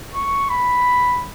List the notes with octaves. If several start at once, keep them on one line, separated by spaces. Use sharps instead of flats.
C#6
B5